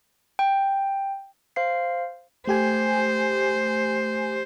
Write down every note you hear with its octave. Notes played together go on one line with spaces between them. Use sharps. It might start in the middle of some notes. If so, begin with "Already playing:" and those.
G5
C5 F5 C7
A3 G4 C5 G#5